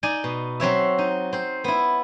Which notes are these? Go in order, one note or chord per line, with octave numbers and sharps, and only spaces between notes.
D#4 D5 G#5
B2
F#3 C4 C#5 E5
D#4
C4 C5
B3 E4